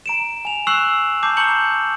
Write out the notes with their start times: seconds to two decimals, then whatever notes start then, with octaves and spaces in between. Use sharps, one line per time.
0.06 A#5 D7 E7
0.45 G#5 F7
0.67 C#6 E6 F#6 C7 E7 F#7
1.23 A5 D6 G6 C7
1.37 A#5 C#6 G6 C#7 F#7